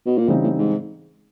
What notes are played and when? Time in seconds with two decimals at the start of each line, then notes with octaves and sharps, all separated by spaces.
0.06 B2
0.18 A#2
0.28 A2 C#3 E3 G3 C4 D#4
0.43 A2
0.58 G#2